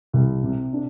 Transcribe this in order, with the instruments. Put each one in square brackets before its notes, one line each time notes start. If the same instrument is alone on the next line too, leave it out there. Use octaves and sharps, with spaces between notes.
[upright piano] C2
C3
D4